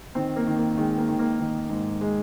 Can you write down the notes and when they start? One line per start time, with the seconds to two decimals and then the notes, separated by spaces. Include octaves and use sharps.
0.15 D#3 C4
0.36 A#3
0.47 D#3
0.56 A#3
0.77 D#3 G#3
0.98 A#3
1.09 D#3
1.19 A#3
1.40 D#3
1.70 G#2
2.01 G#3